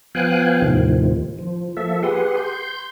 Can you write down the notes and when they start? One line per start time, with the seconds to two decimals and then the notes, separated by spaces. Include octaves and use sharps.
0.15 F3 B3 F5 G5 G#5 F#6
0.62 D#2 A2 C3 D#3 F3
1.39 F3
1.77 F3 A#3 A4 E5
2.03 G4 G#4 B4 F#5 C6
2.37 C6 G6